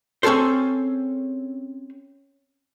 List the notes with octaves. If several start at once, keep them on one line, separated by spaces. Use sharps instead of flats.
C4 C#4 G#4 A4 C5